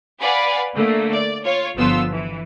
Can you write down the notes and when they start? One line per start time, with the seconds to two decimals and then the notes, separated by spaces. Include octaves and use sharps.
0.21 B4 D5 F5 F#5 G#5 B5
0.74 D3 A3 A#3
1.14 D5
1.44 F4 C#5
1.76 G1 F3 B3 F4 E6
2.11 E3